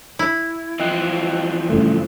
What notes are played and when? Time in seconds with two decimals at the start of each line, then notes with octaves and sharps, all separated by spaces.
0.19 E4
0.80 E3 F3 C4 D#5 G5 F#6
1.70 G2 C#3 A3